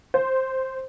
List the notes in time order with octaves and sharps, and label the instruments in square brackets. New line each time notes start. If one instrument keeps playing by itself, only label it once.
[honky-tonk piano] C5